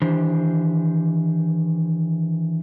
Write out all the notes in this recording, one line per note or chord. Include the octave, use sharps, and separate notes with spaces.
D#3 E3 D4 G4 C5